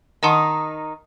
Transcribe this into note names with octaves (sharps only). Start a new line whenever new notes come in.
D#3 D#4 D#5 F#5 A5 C6